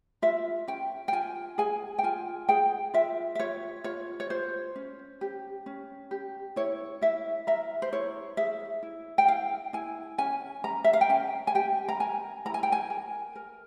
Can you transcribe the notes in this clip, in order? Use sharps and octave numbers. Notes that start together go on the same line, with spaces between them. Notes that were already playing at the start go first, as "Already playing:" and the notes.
F4 E5
C#4 G5
G5
F4 G#5
G#4 G#5
G5
F4 G#5
G#4 G5
F4 E5
E5
F4 C#5
F4 C#5
C#5
F4 C5
C#4
G4
C#4
G4
E4 C#5
E4 E5
A#4 E5
C5
E4 C#5
G#4 E5
E4
G5
E4 F5
E4 G#5
C#4 G#5
C#4 A#5
E5
F5
G5
C#4 G#5
G#5
G4 G5
A#5
A#4 G#5
E4 A#5
G#5
G5
G#5
A#4
A#4